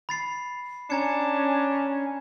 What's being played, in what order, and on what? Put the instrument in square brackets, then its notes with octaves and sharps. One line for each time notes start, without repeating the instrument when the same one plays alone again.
[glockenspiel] B5 A6 C7
[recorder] C#4 [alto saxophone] D4 [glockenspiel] A#5 G#6 C#7